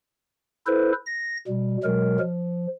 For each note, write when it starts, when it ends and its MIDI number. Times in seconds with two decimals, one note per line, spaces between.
0.66 0.92 64
0.66 0.92 69
0.66 0.92 71
0.66 0.92 72
1.06 1.37 94
1.48 1.77 47
1.48 1.77 55
1.84 2.18 47
1.84 2.18 54
1.84 2.18 56
1.84 2.18 70
2.20 2.67 53